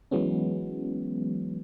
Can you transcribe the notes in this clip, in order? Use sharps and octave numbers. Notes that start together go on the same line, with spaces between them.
E3 F#3 G#3 B3 C#4